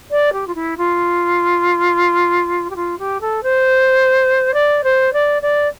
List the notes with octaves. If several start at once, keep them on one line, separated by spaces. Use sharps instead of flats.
D5
G4
F4
E4
F4
G4
F4
G4
A4
C5
D5
C5
D5
D5